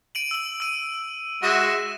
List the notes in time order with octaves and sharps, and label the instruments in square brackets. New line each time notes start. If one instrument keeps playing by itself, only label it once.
[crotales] D7 D#7 F#7
E6 F#7
E6 D#7
[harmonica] G#3 F#4 E5 [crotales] A#6 E7